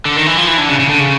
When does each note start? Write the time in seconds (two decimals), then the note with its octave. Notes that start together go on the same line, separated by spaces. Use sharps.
0.05 D3
0.17 D#3
0.26 E3
0.38 F3
0.48 E3
0.58 D3
0.69 C#3
0.79 C#3
0.89 D3
1.00 C#3